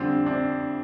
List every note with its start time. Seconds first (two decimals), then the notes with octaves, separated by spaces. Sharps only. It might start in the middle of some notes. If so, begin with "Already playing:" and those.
Already playing: F2 D3 G3 C4 D4
0.26 C4 D4